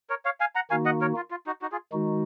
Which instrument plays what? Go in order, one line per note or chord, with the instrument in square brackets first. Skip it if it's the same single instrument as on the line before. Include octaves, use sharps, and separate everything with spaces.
[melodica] A#4 C#5
C#5 F5
F5 G#5
F#5 A#5
[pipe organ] D#3 A#3 D#4 F#4 [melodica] F5 G#5
[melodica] D#5 F#5
A#4 C#5
F4
F4
D#4 F#4
D#4 F#4
F4 G#4
[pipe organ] D#3 G#3 D#4 F#4